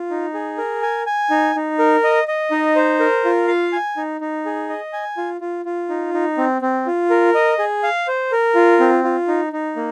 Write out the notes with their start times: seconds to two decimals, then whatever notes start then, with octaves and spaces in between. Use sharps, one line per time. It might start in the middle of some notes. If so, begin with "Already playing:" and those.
Already playing: F4
0.10 D#4
0.34 G#4
0.58 A#4
0.82 G#5
1.06 G#5
1.30 D#4
1.56 D#4
1.79 A#4
2.04 D#5
2.28 D#5
2.51 D#4
2.76 C5
3.00 A#4
3.25 F4
3.48 F5
3.73 G#5
3.97 D#4
4.21 D#4
4.45 G#4
4.69 D#5
4.93 G#5
5.17 F4
5.41 F4
5.65 F4
5.89 D#4
6.14 D#4
6.38 C4
6.62 C4
6.87 F4
7.10 A#4
7.34 D#5
7.59 G#4
7.83 F5
8.08 C5
8.32 A#4
8.55 F4
8.80 C4
9.04 F4
9.28 D#4
9.53 D#4
9.76 A#3